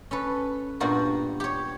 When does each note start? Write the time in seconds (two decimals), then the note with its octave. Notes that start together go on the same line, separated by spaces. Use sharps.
0.11 C#4 A4 B4
0.80 G2 A#2 G3 B3 F#4 A#4
1.40 G4 C#5